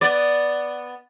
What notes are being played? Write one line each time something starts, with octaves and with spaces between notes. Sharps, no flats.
B3 D5